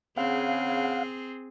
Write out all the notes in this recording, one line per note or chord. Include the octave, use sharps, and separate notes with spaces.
C#3 C4 G#4 F5 F#5